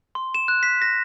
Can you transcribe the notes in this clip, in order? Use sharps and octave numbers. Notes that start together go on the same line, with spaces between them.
C6
E7
F#6
B6
A#6